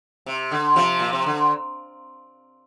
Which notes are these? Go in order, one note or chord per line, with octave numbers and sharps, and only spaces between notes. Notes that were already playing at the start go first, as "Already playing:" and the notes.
C3
D3
C3 F3
A#2
C3
D3